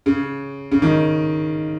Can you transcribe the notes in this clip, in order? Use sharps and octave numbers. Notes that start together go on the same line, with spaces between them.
C#3
C#3
D#3